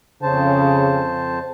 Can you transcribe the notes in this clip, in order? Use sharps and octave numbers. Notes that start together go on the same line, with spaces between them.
F2 C#3 C5 A5